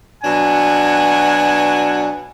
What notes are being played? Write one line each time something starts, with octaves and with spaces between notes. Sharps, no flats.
B2 F#3 D4 F#5 G#5